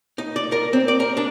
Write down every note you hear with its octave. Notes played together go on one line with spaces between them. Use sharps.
D#4
D5
A#4
C4
D5
A#4
D4